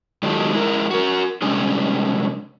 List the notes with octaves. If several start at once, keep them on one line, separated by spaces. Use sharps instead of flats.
D#3 F#3 G#3 F4 G4 A4
G#3 E4 A#4
F#4 A#4
C3 G3 G#3 C#4 D4 G#4